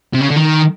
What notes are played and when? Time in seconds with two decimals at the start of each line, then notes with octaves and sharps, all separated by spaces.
0.14 C3
0.21 C#3
0.29 D3
0.37 D#3